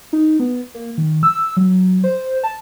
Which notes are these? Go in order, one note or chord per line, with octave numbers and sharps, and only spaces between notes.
D#4
B3
A#3
D#3
E6
F#3
C5
A5